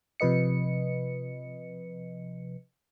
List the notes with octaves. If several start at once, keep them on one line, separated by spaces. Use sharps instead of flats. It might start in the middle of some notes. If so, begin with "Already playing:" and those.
C3 F3 B4 D#5 C#7